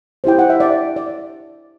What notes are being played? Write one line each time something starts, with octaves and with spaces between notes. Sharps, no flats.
E4 G4 C5 G5
F#5
E5
D5
D5